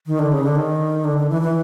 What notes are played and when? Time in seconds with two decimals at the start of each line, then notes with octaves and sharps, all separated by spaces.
0.07 D#3
0.19 D3
0.32 C#3
0.44 D3
0.56 D#3
1.04 D3
1.17 D3
1.30 E3
1.41 E3